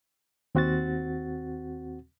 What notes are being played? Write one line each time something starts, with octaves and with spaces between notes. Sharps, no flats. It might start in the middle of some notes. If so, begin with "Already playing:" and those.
D#2 C4 F#4 F#5 A6